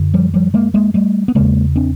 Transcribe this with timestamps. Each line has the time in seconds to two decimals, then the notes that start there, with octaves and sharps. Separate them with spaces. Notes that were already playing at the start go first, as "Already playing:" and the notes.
Already playing: F#2 D3
0.14 F3 G3
0.34 F3 G3
0.54 G#3 A#3
0.74 G#3 A#3
0.94 G3 A3
1.28 B3
1.35 E2 C#3 G#3 A#3
1.76 C4 D4